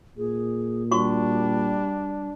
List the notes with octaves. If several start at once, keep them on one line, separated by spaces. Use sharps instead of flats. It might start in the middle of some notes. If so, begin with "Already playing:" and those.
A#2 G#4
G3 D4 F#4 C#6